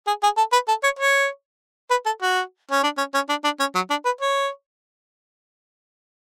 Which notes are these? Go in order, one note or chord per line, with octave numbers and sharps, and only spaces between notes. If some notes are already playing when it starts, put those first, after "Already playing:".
G#4
G#4
A4
B4
A4
C#5
C#5
B4
A4
F#4
C#4
D4
C#4
C#4
D4
D4
C#4
F#3
D4
B4
C#5